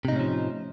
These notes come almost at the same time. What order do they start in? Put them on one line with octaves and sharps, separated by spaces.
C3 D#4 A2 C#4 F3